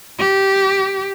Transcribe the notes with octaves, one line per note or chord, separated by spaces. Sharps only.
G4